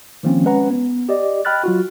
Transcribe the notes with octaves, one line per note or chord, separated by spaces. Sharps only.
D#3 F3 A#3 C4 C#4
G#3 C#4 B4 F#5 A#5
B3
G4 D5 D#5
D#5 G5 B5 F6 F#6 A6
F#3 F4 F#4